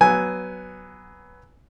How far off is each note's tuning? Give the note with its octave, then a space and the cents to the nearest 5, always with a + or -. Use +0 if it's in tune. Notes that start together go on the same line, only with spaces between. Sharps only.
F#3 +20 B3 +0 G#5 +0